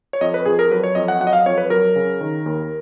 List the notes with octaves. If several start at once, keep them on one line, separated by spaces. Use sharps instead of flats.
C#5
F2 D#5
B4
F2 G#4
A#4
F#3 B4
C#5
F2 D#5
F#5
F#3 F#5
D#5
F5
F2 C#5
B4
F#3 A#4
C#3
D#3
D#2